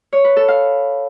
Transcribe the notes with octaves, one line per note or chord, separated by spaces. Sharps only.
C#5
B4
A4
F5